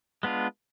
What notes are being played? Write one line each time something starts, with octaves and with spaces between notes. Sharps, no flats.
G#3 B3 D4 F4